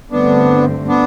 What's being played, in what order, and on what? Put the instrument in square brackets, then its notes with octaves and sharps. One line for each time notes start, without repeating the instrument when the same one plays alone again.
[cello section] G2 D3 A3 C4 [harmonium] B3 D4
[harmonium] B3 D4